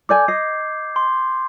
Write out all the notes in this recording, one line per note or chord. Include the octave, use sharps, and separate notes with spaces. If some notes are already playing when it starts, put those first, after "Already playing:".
A4 D5 G#5 D6 G6 G#6
D#5 C7
C6